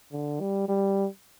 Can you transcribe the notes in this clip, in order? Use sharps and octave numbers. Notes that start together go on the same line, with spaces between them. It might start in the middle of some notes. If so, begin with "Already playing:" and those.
D3
G3
G3